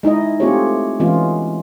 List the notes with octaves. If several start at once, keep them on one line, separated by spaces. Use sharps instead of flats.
G#3 D#4 E4 D#5
A3 C4 F4 G4 G#4 C#5
E3 G#3 B3 C#4 F4